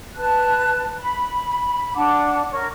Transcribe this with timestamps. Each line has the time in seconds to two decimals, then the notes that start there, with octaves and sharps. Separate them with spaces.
0.14 B4 A5 F#6
0.98 B5
1.95 D4 F#5 A5 D6
2.51 A#4 C#5 C#6